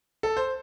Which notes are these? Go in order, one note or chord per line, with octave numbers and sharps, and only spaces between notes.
A4
C5